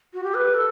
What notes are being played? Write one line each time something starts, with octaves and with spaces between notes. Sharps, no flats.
F#4
G4
B4
A4